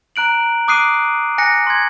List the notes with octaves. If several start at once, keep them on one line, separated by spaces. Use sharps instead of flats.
A#5 F#6 D7 F#7
D6 D#6 F#6 C7 D7 D#7
G#5 F#6 A#6 C#7
C6 G#6